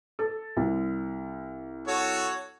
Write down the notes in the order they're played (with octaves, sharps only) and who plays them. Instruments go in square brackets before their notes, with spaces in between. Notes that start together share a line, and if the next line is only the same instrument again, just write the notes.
[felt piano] A4
C2
[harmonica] F#4 A4 C#5